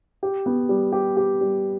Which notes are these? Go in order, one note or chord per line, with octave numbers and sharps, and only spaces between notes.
G4
B3
G3
G4
G4
G3